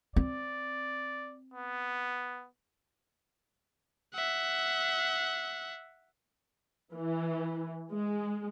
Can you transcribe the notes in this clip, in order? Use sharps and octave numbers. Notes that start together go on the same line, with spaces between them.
C4 D5
B3
E5 F#5
E3
G#3